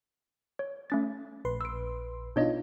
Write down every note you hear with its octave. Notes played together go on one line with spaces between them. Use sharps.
C#5
A3 C#4 A6
A#1 B4 C6
E6 D7
B2 D4 D#4 F4 C#5 D#5